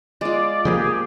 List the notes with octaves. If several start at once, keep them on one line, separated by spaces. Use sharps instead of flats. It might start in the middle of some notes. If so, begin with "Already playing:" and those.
G#3 F4 D5
C#3 F3 A#3 G4 G#4